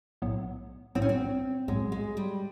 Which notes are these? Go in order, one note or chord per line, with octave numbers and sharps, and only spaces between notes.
B1 A2 F#3 B3
B1 A2 F#3 B3 C4
C#4
C4
B1 A2 F#3 G#3 B3
G#3
G3